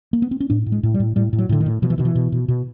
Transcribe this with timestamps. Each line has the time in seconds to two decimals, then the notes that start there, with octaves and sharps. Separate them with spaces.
0.13 A#3
0.22 B3
0.31 C4
0.40 C#4
0.50 A2 D4
0.66 A2
0.72 G#3
0.83 A2
0.94 G3
1.00 A2
1.16 A2 G3
1.33 A2
1.39 F#3
1.49 A2 D3
1.60 D#3
1.66 A2
1.82 B2 F3
1.90 E3
1.98 B2 D#3
2.05 E3
2.15 B2
2.32 B2
2.48 B2